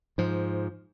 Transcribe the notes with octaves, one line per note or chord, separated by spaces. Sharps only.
G#2 F3